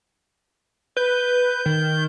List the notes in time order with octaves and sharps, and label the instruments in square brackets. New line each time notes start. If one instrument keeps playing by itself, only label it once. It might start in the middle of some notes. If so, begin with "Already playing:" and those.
[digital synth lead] B4 [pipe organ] G6
[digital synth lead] D#3